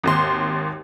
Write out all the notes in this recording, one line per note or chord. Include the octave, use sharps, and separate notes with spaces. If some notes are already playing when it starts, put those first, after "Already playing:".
G#1 D#2 C6